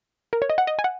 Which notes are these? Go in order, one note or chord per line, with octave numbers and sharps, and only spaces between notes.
A#4
C#5
D#5
F#5
D#5
G#5
F#5